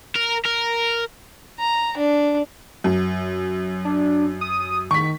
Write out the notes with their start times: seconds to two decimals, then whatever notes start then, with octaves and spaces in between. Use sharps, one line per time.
0.15 A#4
0.46 A#4
1.59 A#5
1.97 D4
2.84 F#2
3.85 D4
4.41 D#6
4.91 D#3 C#6 B6